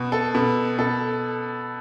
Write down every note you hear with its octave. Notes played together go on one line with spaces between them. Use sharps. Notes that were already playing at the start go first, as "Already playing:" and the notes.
Already playing: B2
A4
B2
B2 A4